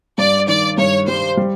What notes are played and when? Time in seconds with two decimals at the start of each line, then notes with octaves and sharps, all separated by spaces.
0.18 G2 D5
0.48 D#3 D5
0.78 G2 C#5
1.08 G3 C5
1.37 G3